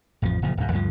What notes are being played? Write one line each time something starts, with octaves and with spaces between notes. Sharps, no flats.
A1 F2 D#3 F3
F#1 A#2 F3
D1 F#2
D2 G2 D3 F3